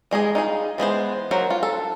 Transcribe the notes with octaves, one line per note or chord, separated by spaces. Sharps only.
G3 G#3 D#4 G#4
D#4 F4 G#4
E3 G#3 B3 C5
F#3 A#4 C5 F#5
F4
A4